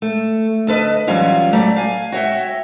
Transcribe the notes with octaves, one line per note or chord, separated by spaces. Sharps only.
A3
D2 A4 B4 D#5
E3 F#3 G3 C#4 F4 F#4
F#3 A3 D5
F5 G#5
F#4 C#5 E5 G5